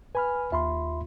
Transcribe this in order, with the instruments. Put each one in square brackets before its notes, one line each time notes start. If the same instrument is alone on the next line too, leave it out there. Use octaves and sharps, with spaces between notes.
[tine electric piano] B4 B5 [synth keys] G#5 F6
[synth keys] D#2 F4 [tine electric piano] E5 B5 C6